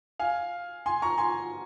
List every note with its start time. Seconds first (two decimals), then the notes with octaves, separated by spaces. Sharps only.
0.19 F5 G#5
0.86 G#5 C6
1.02 A#5 C#6
1.18 G#5 C6